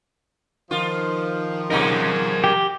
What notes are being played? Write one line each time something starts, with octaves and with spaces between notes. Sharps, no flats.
D#3 F3 F4
B2 G#3 D#4 A#4 F#5
G4